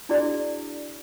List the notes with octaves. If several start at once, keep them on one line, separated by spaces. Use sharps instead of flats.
D4 E4 F#4 G#4 D5